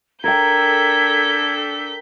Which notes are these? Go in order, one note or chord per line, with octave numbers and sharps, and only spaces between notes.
D4 A4 A#4 G5 G6 G#6 B6